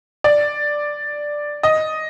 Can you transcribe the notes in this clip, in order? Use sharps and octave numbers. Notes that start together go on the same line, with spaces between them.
D5
D#5